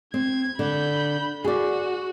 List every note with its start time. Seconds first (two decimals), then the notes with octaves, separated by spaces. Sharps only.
0.14 C4 G#6
0.59 D3 B5 G6
1.44 F#4 G#4 D5